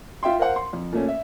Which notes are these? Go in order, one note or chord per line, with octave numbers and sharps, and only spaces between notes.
F4 E5 G5 C6
A#4 C5 F5 F#5
C6
F2
A#2 A3 C#4
E5